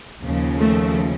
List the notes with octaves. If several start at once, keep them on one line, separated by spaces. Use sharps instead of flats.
D#2 C#3 F3
A3